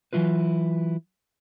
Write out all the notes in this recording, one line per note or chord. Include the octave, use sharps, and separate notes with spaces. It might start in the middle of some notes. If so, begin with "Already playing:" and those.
E3 F#3 E4 F4 B4